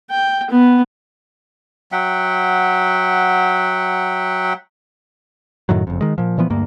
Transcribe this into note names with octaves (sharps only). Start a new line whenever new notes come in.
G5
B3
F#3 E5 F#5 G5
F#2 A2 D#3 F#3
F#1 F2
D#3 G#3
A#2 F3
A#2 E3 F3 B3
D2 G2 A#3